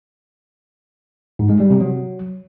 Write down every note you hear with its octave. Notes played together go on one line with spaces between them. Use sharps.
G#2
G#3
G3
C3
F#3